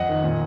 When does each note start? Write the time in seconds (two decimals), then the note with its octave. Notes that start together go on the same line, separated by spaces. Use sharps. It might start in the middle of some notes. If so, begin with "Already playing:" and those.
Already playing: F2 D#5 F#5
0.09 D#3
0.24 A#2